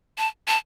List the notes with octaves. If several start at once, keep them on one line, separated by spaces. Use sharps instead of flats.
A5
A5